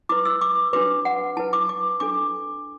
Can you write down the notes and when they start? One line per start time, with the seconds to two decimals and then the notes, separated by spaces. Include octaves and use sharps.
0.09 E4 B4 D6
0.25 E6
0.41 D6
0.73 D4 F#4 B4 D6
1.05 F#5
1.37 E4 B4 A5
1.53 D6
1.69 D6
2.00 D4 F#4 A4 D6